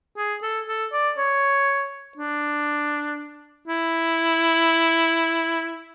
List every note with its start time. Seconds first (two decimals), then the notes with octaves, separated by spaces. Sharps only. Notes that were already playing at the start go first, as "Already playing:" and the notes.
0.17 G#4
0.43 A4
0.68 A4
0.93 D5
1.18 C#5
2.18 D4
3.68 E4